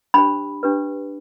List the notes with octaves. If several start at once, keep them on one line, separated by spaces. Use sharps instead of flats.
D4 G4 C5 B5
D4 G4 B4